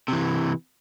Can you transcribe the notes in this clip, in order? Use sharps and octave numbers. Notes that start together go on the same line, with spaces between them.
C3 E3